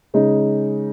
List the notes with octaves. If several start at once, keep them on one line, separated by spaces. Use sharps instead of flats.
C#3 G#3 D#4